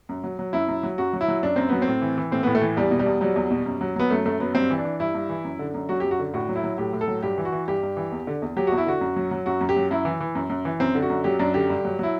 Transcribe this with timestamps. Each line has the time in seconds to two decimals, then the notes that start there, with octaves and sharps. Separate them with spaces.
0.09 F#2
0.24 F#3
0.39 F#3
0.53 F#2 E4
0.68 F#2
0.83 F#3
0.98 F#2 F#4
1.13 F#3
1.21 E4
1.28 F#3
1.43 F#2 D4
1.56 F#2 C4
1.69 F#3 B3
1.82 C4
1.87 A2
2.02 E3
2.18 E3
2.32 A2 C4
2.43 B3
2.47 A2
2.55 A3
2.62 E3
2.77 E2 G3
2.91 B2
2.99 G3
3.06 E2
3.21 F#3 G3
3.36 E2
3.51 B2
3.66 F#2
3.81 F#3
3.96 F#3 B3
4.10 F#2 A3
4.25 F#2 A3
4.40 F#3 B3
4.55 G2 C4
4.70 E3
4.78 D4
4.85 E3
5.00 G2 E4
5.14 G2
5.29 E3
5.44 F#2
5.59 D3
5.74 F#2
5.89 F#3 F#4
6.00 G4
6.04 F#2
6.11 F#4
6.19 D3
6.34 A2 F#4
6.49 F#3
6.56 E4
6.63 F#3
6.78 A2 G4
6.93 A2
7.01 A4
7.08 F#3
7.23 G2 G4
7.38 E3
7.45 F#4
7.52 E3
7.68 G2 G4
7.83 G2
7.97 E3
8.12 E2
8.27 D3
8.42 E2
8.56 F#3 G4
8.67 E2 F#4
8.78 E4
8.86 D3 F#4
9.01 F#2
9.16 F#3
9.31 F#3
9.46 F#2 F#4
9.61 F#2
9.69 G4
9.76 F#3
9.91 F#2 E4
10.05 E3
10.20 E3
10.35 F#2
10.50 F#2
10.65 E3
10.80 F#2 C4
10.95 D3
11.02 F#4
11.10 F#2
11.24 F#3 G4
11.39 F#2 D4
11.54 D3 G4
11.70 G2
11.85 F#3
11.99 F#3 E4